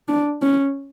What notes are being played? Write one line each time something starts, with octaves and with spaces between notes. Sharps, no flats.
D4
C#4